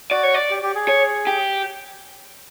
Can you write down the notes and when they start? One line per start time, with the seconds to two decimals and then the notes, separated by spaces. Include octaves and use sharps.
0.11 F#4 D5
0.23 C#5
0.34 D5
0.50 G4
0.63 G4
0.75 G#4
0.88 C#5
1.27 G4